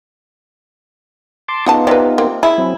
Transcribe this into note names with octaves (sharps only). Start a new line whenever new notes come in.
A5 C6 D6
C#3 B3 D#4 F4 F#5 A5
C3 B4 D5
A#3 C4
E4 G#4
F#3 C4